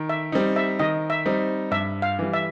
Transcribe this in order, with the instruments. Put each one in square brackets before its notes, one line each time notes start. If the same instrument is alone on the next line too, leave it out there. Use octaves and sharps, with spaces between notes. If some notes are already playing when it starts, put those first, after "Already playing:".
Already playing: [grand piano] D#3
[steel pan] E5
[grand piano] G3 C4 D#4
[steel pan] E5
[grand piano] D#3 [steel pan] D#5
[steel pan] E5
[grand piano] G3 C4 D#4
[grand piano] G2 [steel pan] E5
[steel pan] F5
[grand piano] E3 G3
[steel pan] E5